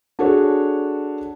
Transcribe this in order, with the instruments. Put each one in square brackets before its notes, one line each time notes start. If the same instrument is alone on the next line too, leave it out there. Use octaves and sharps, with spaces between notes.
[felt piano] D4 F#4 G#4 A4 C#5